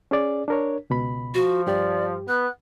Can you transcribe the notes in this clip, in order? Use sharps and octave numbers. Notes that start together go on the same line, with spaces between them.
C#4 G#4 D5
D4 A#4 C#5
C#2 B2 B5
F3 F#4
G2 G4 D5
B3 F#6